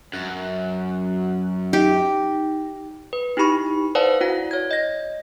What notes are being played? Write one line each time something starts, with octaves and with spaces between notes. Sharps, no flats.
F#2 F#6
D#4 G4
B4
D#4 E4 G4 B5 C#6
B4 C5 D5 F5 F#5 A5
E4 F#4 F#5
C#5 G#6
D#5 A#6